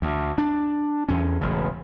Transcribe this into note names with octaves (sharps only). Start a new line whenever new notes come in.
D2
D4
E2 C#4
E1 A1 C#3